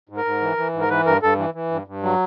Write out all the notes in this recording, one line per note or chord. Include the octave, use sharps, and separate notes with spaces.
G#2
A#4
G#2
E3
E3
G#2
A#4
E3 B4
G2 A#4
G2 A4
E3
E3
G2
G2
F#3